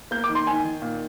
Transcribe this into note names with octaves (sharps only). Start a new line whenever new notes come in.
A#3 G6
D6
D#3
C6
D#3 G#5
D#3
A#2